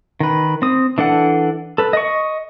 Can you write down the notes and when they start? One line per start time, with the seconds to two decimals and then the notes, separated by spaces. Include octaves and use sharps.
0.20 D#3 B4
0.62 C4 D#6
0.98 E3 D4 A4 F#5
1.78 A4 B4
1.93 D#5 C#6